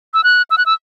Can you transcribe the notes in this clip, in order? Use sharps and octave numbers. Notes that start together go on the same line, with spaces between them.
E6
F#6
E6
F#6
E6